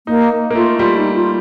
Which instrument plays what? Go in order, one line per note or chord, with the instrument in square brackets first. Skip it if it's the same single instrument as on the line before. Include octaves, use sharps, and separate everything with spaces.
[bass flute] A#3 [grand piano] D#4
[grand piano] A#3
[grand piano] A3 [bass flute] F4
[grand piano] G3 [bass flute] F4
[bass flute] D#4
F4